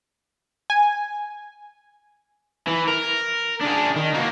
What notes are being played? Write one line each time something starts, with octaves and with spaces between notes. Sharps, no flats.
G#5
E3
A#4
D4 G#4
D#3
A#3 F#4